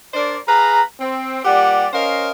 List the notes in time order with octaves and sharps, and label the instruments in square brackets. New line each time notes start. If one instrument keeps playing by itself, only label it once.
[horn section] D4 A#4 C5 D5
G#4 B4 F5 A#5
C4
A#2 G3 G4 D5 F#5
C#4 A#4 C5 D#5 F5